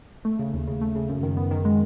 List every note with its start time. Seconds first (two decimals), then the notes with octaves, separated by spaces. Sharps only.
0.25 A3
0.39 C#3
0.54 D#2
0.68 C#3
0.81 A3
0.96 C#3
1.09 F#2
1.23 D#3
1.37 B3
1.51 D#3
1.65 G#3